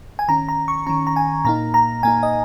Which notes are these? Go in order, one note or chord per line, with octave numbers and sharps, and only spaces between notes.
G#5
D#3 C#4 A#5
A#5
C#6
D#3 C#4 A#5
A#5
G#5
A#2 A#3 D#4 A#5
A#5
A#2 A#3 D#4 G#5
D#5